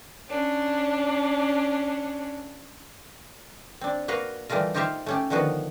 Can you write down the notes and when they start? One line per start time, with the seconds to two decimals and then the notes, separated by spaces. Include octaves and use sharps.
0.29 C#4 D4
3.81 C4 D4
4.08 A#3 F#4 B4 F5 A#5
4.50 E3 G3 A3 F4 A#4
4.74 D#4 F4 G4 C5 E5 F5
5.06 A3 C#4 G4
5.30 D3 D#3 F3 B3 F#4 B4